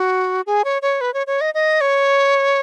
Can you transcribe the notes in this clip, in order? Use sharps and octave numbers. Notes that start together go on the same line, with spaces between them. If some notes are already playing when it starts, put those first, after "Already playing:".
Already playing: F#4
G#4
C#5
C#5
B4
C#5
C#5
D#5
D#5
C#5